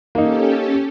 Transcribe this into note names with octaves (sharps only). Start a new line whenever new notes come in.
A#3 C#4 D#4 G4 A4